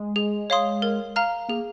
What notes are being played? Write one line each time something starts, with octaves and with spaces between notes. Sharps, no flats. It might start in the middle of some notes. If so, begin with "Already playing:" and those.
Already playing: G#3
G#4
C#5 F5 C6 D#6
A#4
F5 A#5 F6
A#3 G#4